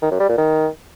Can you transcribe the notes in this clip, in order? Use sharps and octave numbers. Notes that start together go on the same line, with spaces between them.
D#3
F#2
G3
A#2
D#3